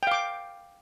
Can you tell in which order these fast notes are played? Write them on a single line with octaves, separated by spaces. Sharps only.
G5 F5 D6